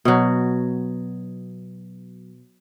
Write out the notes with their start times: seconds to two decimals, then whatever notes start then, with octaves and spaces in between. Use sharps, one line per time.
0.05 B2 F#3